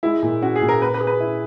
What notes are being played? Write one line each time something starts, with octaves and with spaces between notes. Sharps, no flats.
G#3 E4
A#2
C#4 F#4
G#4
A#2
A#4
A#3 B4
B4
G#4
B4
E4